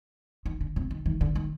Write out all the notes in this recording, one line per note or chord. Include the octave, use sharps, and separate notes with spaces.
D#3
D3
C3
D#3
D#3
D3
D#3